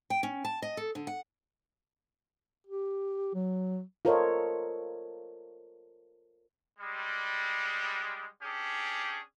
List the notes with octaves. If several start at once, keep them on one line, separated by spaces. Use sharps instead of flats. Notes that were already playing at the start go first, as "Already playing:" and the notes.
G5
C#4
A5
D#5
A4
D3
F#5
G4
F#3
F4 A4 A#4 C5 C#5 D#5
G3 G#3
C#4 D4 G4 G#4